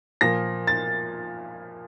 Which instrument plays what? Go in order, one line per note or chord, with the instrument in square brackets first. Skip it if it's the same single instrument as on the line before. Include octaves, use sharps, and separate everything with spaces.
[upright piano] A#2 F3 A#3 A#6
A6